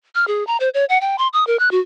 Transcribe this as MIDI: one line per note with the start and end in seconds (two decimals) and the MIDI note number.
0.15 0.27 89
0.28 0.46 68
0.47 0.57 82
0.60 0.69 72
0.74 0.85 73
0.89 0.98 78
1.01 1.16 79
1.18 1.28 84
1.33 1.46 87
1.47 1.57 70
1.59 1.71 90
1.71 1.80 66